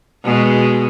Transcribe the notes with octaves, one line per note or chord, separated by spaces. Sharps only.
B2 G#3